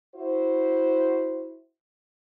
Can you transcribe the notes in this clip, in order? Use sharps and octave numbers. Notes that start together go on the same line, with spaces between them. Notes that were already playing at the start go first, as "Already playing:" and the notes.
E4 F#4 C5